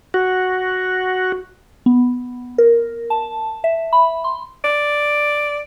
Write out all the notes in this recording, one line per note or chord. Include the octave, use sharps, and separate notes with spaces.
F#4
B3
A#4
A5
E5
B5
C6
D5